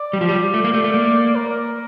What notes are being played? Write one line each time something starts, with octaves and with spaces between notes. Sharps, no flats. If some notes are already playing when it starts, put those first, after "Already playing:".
Already playing: D5
G3
F3
G3
A3
A#3
A3
A3
A#3
A#4